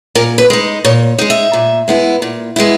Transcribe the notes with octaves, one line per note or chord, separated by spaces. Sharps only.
A#2 A#4
B4
G#3 D#4
A#2 C#5
G#3 D#4
E5
A#2
G#3 B3 E4
A#2
G#3 B3 E4